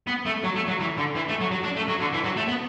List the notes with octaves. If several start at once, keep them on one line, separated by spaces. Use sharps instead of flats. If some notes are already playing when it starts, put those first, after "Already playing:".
B3
A3
F#3
A3
F#3
E3
D3
E3
A3
F#3
F#3
D4
A3
F#3
D3
E3
F#3
A3
B3